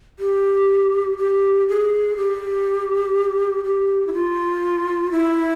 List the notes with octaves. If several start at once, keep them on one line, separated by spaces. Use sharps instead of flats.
G4
G4
G#4
G4
G4
E4
F4
E4